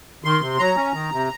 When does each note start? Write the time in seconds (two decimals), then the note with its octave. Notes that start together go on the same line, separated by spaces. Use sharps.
0.24 D#3 C6
0.41 C3
0.59 F#3 A#5
0.76 C#4
0.94 D#3
1.13 C3